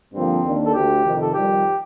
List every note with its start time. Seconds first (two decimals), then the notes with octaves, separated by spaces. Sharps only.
0.13 G2 D3 F3 A#3 C4
0.43 D#2 D#3 A#3 D4
0.66 A4
0.73 D2 D3 A3 G4
1.04 F2 C3 D#3
1.22 A4
1.34 F2 D#3 G3 G4